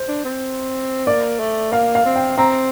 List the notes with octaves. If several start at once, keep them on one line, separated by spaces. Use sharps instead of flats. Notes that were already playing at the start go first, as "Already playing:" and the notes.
Already playing: C5
D4
C4
A#3 D5
A3
A#3 F5
F5
C4
G5
C4 A#5